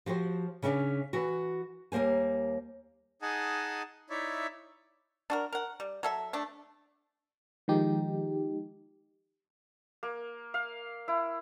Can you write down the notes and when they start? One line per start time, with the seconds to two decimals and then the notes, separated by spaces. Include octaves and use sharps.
0.06 F3 F#4 G4 C5
0.62 C#3 C#4 D4 E5 F5
1.13 E3 F#4
1.92 D#2 G3 A#3 C5 G#5
3.22 D#4 G#4 D#5 F#5 G#5 A5
4.10 D#4 E4 C#5 D5 E5
5.30 D4 F#4 A#4
5.52 A#4 F#5
5.80 G3
6.03 F#3 A4 E5
6.33 A3 D4
7.68 D#3 F3 G#3 D#4 G4
10.03 A#3
10.54 F5
11.08 E4